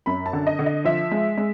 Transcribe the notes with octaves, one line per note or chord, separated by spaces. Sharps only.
F#2 B5
A5
D3
D#5
D3
D#5
F3 E5
G#3
G#3